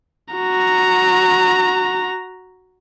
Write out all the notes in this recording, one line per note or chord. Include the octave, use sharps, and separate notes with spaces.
F#4 A#5